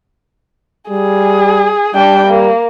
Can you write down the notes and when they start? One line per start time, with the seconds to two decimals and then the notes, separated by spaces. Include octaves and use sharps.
0.90 G3 G#4
1.95 G3 D4 G5
2.27 A#3